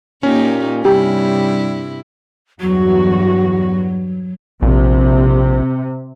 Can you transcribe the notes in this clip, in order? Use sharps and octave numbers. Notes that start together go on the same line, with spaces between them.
A#2 A#3 C#4 D#4 G4
G2 C3 G3 E4 G4
E2 G2 F#3 F#4
A#1 C3